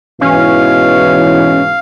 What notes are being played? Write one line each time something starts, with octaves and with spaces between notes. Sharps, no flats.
G#2 B2 E3 C#4 F5